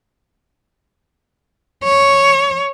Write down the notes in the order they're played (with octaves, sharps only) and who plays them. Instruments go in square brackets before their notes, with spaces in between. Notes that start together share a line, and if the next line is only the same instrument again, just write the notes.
[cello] C#5